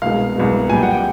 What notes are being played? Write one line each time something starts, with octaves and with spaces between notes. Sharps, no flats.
C2 B2 G#3 F5
C2 B2 G#3
A#2 G3 G5 G#5
F#5
G5